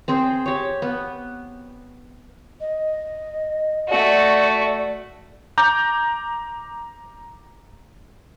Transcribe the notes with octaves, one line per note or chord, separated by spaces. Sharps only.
C4 G#4 C5
G4 C#5
B3
D#5
A3 F#4 D5
A#5 D6 G6